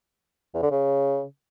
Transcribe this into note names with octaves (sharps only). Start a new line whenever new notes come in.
E2
D3
C#3